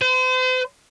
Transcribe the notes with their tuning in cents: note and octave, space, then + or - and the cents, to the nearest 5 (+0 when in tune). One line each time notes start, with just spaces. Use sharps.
C5 -40